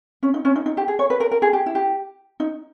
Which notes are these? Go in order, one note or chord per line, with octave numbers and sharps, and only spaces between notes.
C#4
D#4
C#4
D#4
D#4
G4
G#4
C#5
B4
A#4
A#4
G#4
G4
E4
G4
D#4